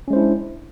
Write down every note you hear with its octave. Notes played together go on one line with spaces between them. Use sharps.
G#3 C#4 D4 E4 C5